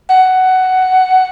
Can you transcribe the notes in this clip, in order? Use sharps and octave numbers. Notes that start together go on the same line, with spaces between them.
F#5